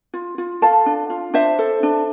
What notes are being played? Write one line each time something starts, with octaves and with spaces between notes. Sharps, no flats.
F4
F4
A4 F5 A5
D4
F4
D4 C5 E5
A4
D4